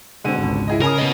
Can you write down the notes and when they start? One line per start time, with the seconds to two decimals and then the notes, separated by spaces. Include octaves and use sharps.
0.25 B2 D3 G#3 C4 D#7
0.38 G#1 C#2
0.68 E4 G#4 D#5
0.81 C#3 A#4 G#5 D#6
0.98 B3 D#5